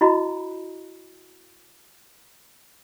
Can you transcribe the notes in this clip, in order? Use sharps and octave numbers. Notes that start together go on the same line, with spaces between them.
E4 F#4 D#5 A#5 B5